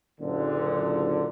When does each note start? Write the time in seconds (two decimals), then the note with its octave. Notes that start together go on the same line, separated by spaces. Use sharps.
0.21 F#1 A#2 D3